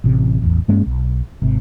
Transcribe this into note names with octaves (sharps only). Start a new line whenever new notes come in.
A1 C3
A1 E2
G2 G#3 A#3 C#4
B1
G#1 C3